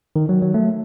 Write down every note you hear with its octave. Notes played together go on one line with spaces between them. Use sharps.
D#3
F#3
F#3
A3